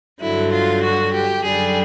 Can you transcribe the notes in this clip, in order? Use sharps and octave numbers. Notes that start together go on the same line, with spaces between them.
G2 D3 F#3 E4
F4
F#4
G4
F#2 D3 G3 G#4